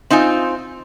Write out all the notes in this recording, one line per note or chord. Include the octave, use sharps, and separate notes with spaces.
C4 D#4 F4 G#5